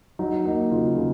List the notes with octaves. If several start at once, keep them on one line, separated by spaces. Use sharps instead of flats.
F#3 D#4
A#3 D#4
C#3 F4
C#3